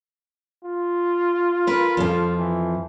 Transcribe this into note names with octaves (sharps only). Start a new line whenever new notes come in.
F4
A#4 B4
F2 F3
E3